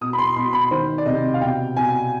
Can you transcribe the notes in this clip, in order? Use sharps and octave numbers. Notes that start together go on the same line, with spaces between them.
B2 D#6
B5
C6
B2 C6
B5
D#3 C5
D5
C3 D#5
F5
B2 G5
B2 G#5